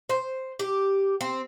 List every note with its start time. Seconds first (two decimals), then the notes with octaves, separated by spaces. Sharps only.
0.09 C5
0.59 G4
1.21 C4